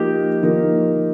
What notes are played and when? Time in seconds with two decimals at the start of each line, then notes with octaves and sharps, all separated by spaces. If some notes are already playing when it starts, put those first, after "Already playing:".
Already playing: F3 A#3 D#4 G4 A#4
0.43 F3 A#3 D#4 A#4